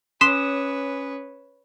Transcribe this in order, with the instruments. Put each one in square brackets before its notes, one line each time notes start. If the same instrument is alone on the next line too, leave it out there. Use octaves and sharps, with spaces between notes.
[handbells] C#4 D#6 [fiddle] B4 C#5 [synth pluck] C6 B6 [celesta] E7